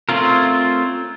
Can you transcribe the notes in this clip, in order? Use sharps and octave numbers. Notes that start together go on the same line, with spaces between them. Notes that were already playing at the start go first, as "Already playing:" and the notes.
A3 C4 C#4 F4 A#4